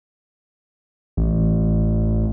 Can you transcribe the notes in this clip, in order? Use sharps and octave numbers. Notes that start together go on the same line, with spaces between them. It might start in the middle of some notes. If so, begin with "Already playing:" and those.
A1